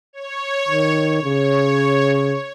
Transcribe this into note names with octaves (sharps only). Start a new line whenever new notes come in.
C#5
D#3
C#3 C#5